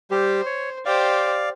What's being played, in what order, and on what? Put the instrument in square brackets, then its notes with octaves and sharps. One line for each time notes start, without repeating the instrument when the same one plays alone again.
[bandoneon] G3 G4 [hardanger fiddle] C5
[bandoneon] C#5
[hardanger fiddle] G4 C5 [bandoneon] D5 F5